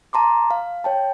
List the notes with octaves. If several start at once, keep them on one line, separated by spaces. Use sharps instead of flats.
A5 A#5 C6 D6
F5
C#5 G5 A5